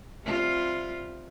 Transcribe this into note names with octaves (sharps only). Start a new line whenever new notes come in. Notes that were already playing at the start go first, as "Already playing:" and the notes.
C3 G3 F4